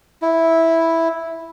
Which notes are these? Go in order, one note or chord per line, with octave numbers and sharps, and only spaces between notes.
E4